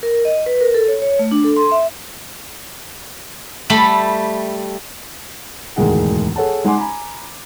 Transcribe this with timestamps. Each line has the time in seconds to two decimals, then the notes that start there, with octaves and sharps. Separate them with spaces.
0.03 A#4
0.25 D#5
0.46 B4
0.61 A#4
0.74 A4
0.88 C#5
1.02 C#5
1.19 A3
1.32 D4
1.44 A4
1.57 C6
1.72 E5
3.70 G3 A3 B5
5.76 E1 D2 G#2 D#3 G#4 F#5
6.36 G#4 A4 C#5 F#5 A5
6.64 G#3 D#4 F#5 G#5 C6 D6
6.77 G#5 A#5 B5